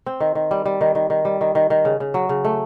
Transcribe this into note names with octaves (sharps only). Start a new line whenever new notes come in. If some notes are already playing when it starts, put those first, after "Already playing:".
C4
D#3
D#3
G3
G3
D#3
D#3
D#3
G3
D#3
D#3
D#3
C#3
C#3
F#3
C#3
A3